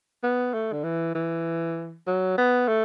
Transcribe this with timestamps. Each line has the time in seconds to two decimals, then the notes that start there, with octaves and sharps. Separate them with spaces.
0.23 B3
0.54 A3
0.72 D3
0.84 E3
1.15 E3
2.07 F#3
2.37 B3
2.68 A3